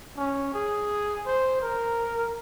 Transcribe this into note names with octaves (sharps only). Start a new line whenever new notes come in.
C#4
G#4
C5
A#4